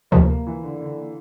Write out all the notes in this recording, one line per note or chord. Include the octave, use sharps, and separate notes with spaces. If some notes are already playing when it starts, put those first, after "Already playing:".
D2 C3 F3 A#3
A#3
E3
D3
D3